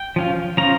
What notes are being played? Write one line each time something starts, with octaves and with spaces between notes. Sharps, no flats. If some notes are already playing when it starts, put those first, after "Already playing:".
Already playing: G5
F3 C#4 F4
F3 C#4 F4 A#5